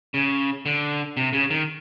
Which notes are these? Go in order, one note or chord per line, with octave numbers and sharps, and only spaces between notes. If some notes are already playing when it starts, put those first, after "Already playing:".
C#3
D3
C3
C#3
D#3